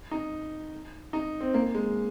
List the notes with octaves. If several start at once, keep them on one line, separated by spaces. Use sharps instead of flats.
D#4
D#4
C4
A#3
G#3